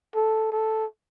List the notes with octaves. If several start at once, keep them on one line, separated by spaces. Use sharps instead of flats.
A4
A4